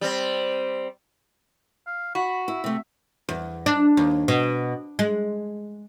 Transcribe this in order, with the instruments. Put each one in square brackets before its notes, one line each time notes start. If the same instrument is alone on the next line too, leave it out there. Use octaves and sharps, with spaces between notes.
[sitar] G3 C4
[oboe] F5
[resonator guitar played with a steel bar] F#4 [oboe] B5
[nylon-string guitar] E4 [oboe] E5
[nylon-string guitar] C3 A3
[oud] E2
D4
D#2
B2
G#3